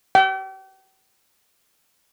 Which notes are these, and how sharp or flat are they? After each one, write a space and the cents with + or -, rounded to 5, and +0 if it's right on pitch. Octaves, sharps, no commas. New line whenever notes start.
G5 -40